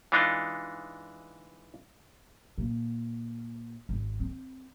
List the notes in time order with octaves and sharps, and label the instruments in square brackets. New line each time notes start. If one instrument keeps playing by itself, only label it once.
[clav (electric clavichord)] E3 G#3 D4 D#4 F4
[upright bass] A#2
G#1
C4